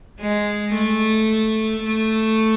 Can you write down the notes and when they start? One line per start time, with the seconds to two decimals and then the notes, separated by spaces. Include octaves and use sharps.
0.21 G#3
0.75 A3
1.85 A3